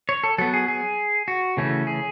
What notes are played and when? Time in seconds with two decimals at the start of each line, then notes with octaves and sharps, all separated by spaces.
0.09 C#5
0.24 A4
0.38 F#3 B3 A4
0.54 G#4
0.68 G#4
1.28 F#4
1.57 C#3 E3 A3 C#4
1.87 G#4